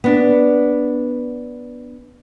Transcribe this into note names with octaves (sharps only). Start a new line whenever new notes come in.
B3 D4